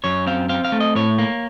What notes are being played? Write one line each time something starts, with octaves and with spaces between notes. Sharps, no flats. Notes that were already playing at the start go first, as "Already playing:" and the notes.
F#2 C#5
C4 F5
C4 F5
F5
A3
D#5
A2 C#5
A#3